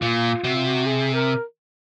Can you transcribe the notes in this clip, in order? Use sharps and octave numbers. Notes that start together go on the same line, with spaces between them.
A#2 F4
C3 F#4
F4
F#4
G#4
A#4